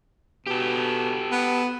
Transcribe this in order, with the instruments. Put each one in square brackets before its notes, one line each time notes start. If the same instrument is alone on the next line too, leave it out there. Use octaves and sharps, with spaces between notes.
[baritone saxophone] B2 [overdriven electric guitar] G4 A4
[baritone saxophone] B3